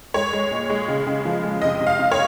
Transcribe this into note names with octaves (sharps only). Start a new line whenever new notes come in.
G#3 C#5
G#3
A#2
G#3
C#3
C#3
F3
G#3
C3 D#5
C3
F5
C3
C#5